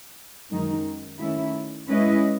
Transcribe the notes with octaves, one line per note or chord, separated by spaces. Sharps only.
F#2 D#3 G#3 D#4
D#3 A3 C#4 E4
G#3 C#4 E4 B4 D#5